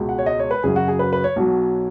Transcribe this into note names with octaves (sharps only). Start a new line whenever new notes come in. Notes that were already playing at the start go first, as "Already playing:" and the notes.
Already playing: C#2 B2 G#3
F#5
C#5
D#5
C#5
B4
F#2 C#3 F#3 G#4
F#4
G#4
B4
B4
C#5
B1 B2 F#3